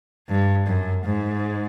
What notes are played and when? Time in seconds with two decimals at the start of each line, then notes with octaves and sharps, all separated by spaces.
0.28 G2
0.67 F#2
1.05 G#2